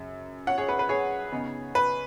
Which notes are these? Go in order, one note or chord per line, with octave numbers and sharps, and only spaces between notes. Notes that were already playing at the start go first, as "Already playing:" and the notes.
Already playing: F#2 C#3
C#5 F#5
G#4 C#5
B4
B4
G#4 C#5
C#3 B3 D#4
B4